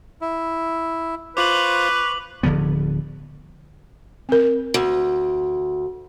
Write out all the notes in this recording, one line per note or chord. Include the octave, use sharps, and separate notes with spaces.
E4
F4 B4 C5 C#6 D6 F#7
D1 D3 F3 B3
C4 A#4
D2